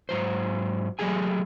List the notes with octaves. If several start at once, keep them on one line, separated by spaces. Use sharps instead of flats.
G#2 F#3 C5
F#3 A3 G4 G#4 G#5